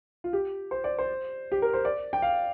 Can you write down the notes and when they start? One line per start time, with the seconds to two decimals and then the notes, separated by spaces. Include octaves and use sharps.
0.24 F4
0.33 G4
0.71 C5
0.84 D5
0.99 C5
1.52 G4
1.62 A#4
1.74 C5
1.85 D5
2.13 G5
2.22 F5